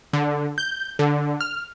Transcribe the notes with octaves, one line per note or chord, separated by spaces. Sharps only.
D3
G6
D3
F6